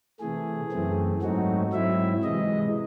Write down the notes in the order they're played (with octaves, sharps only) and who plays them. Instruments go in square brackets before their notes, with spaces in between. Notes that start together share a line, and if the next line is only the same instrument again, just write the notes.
[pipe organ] C3 E3 A3 G#4
F#2 E3 A3 C4
G#2 F#3 A3 C4 D#4 F#4
G#2 F#3 C4 E4 E5
C3 E3 G#3 D#5